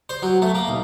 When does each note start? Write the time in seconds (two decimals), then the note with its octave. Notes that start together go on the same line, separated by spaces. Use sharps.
0.09 C5
0.22 F#3
0.42 A3
0.55 A#3
0.68 B1